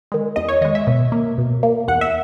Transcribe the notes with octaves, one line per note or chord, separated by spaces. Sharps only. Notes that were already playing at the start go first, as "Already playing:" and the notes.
D#3 G#3
E2 D#5
C#5
D#3 G#3 D#5
E5
B2
A#3
B2
A#3
E2 F#5
E5